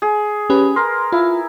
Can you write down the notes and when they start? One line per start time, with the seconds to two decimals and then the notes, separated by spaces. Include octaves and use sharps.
0.02 G#4
0.50 C#4 G4 B4
0.76 A#4 C6
1.12 E4 F4